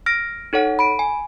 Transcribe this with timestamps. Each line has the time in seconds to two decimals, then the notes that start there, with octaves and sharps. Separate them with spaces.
0.06 F6 A#6 D7
0.53 D#4 A4 C#5 F#5
0.79 B5 D7
0.99 G#5